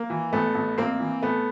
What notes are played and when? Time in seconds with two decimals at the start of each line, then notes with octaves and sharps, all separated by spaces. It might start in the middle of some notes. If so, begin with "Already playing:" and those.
Already playing: A#3
0.10 E3
0.33 A1 A3 B3
0.55 A1
0.78 A1 A#3 C4
1.00 E3
1.22 A2 A3 B3